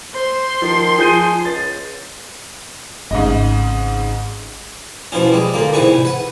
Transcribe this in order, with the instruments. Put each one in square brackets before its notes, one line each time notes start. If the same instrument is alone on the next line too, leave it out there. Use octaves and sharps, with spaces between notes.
[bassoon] C5 [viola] C6
[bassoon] D#3 [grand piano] F3
[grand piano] F3 G6 D#7 [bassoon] G#4
[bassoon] C#2 [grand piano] A6
[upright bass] G#1 [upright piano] G#2 C#3 D#5
[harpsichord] B2 E3 F3 C#4
G3 G#3
A#2 D3 A#3
G#2 C3 E3 B4 G#5 C#6
B4 F#5